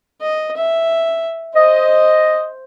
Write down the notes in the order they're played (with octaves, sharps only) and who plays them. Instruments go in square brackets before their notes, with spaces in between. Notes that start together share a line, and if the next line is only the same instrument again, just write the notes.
[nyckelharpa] D#5
E5
[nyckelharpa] C5 [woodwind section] D#5